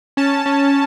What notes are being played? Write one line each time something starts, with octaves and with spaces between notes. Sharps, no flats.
C#4 A5
C#4